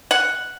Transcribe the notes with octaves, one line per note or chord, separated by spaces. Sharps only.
F#5